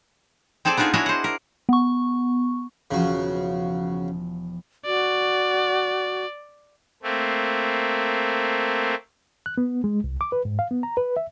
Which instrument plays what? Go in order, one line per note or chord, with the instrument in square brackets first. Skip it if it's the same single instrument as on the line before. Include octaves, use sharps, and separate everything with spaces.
[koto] C4 G#4 A4 C5 D5
B3 D4 D#4 F4 G#4
D4 E4 F#4 G#4 C#5 D#5
C5 F#5
A#4
[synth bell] B3 C#6
[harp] E1 F3 [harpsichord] C#3 F#4
[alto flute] F#4 [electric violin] D5
[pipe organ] A3 A#3 C4
[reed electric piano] F#6
B3
G#3
C2
D6
B4
G#2
F5
B3
A#5
B4
E5